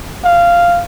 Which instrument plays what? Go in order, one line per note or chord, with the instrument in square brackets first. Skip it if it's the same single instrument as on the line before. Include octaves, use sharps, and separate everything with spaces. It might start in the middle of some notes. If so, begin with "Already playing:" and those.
[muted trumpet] F5